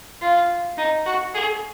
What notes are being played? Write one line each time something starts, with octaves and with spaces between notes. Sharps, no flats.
F4
D#4
F#4
G#4